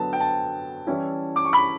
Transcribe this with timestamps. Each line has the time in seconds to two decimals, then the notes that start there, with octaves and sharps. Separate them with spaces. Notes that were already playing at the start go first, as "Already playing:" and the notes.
Already playing: D3 F#3 B3 A5
0.13 G5
0.20 A5
0.87 E3 G3 C#4 E4
1.36 D6
1.45 C#6
1.53 B5